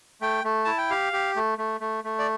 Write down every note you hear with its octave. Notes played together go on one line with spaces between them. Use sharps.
A3 G5
A3
E4 A5
G5
G4 F5
G4
A3
A3
A3
A3
D5